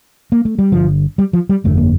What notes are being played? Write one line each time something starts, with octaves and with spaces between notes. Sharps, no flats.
A#3
A3
G3
G1 G2 D3 F3
G3
F3
G3
G1 F2 D3 A3
A#3